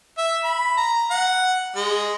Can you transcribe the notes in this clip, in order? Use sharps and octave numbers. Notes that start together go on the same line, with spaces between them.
E5
B5
A#5
F#5
G#3